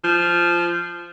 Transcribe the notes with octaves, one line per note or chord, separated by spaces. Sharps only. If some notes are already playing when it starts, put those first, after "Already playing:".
F3